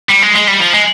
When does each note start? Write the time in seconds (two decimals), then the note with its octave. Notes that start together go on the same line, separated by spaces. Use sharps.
0.10 G3
0.23 G#3
0.36 G#3
0.48 G3
0.60 F3
0.74 G#3